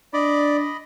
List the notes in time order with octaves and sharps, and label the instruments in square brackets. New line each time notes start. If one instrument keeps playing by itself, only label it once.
[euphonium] D4 [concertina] D5 [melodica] D#5 B5